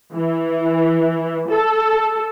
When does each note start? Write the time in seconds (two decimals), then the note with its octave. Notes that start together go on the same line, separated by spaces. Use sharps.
0.13 E3
1.49 A4